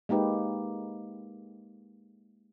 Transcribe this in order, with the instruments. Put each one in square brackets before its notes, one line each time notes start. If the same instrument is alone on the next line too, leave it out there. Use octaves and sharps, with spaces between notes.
[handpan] G#3 A#3 D#4 G4 B4